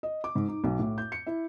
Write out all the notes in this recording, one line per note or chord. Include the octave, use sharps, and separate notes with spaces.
D#5
D6
G#2
D#4
B1
A2
G6
C#7
E4